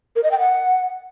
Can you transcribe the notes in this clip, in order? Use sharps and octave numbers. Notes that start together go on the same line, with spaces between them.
A#4
D#5
G5
F#5